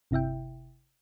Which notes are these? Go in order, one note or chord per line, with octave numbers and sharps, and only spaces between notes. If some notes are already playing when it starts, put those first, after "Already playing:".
G1 C3 E4 E5 G5